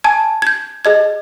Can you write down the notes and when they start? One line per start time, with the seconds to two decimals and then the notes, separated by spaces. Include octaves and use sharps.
0.04 G#5 A5 G#6
0.42 G6 G#6
0.85 G#4 D#5 G#6